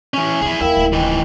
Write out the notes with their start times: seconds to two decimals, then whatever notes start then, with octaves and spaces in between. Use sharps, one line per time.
0.14 E3 C#4 G#5
0.41 A#1 E2 E4 G#4
0.60 D#2 D#3 E4 A#4 E5 F5 G5
0.77 D1 G#2
0.93 D#3 E3 G5